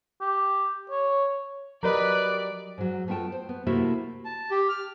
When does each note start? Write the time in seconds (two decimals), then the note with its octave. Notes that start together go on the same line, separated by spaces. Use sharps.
0.21 G4
0.91 C#5
1.83 F#3 G4 A#4 B4 D5 D#5
2.78 G#2 F#3
3.08 A3 B3 F4 G5 A5
3.32 C5
3.49 B3
3.66 C3 A3 A#3 E4 F#4 A4
4.25 A5
4.51 G4
4.69 F6